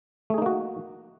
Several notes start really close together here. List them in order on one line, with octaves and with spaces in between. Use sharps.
A3 G#4 D#4 A#3 F#4